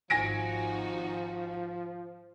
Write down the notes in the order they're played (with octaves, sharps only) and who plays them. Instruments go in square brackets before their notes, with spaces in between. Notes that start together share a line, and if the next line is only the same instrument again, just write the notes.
[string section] G#1 D#4 F#4 [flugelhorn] F3 [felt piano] G#5 A#6 D7